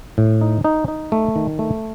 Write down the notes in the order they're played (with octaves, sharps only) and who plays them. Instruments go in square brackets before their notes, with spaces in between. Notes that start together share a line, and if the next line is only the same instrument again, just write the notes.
[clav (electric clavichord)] A2
D#4
D#4
D#4
A3
D#3
A3